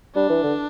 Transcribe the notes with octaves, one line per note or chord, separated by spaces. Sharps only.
G3 D4
E3
D3